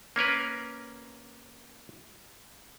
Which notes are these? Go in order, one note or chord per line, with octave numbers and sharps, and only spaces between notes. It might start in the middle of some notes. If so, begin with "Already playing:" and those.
A#3 C#4 A#4 B4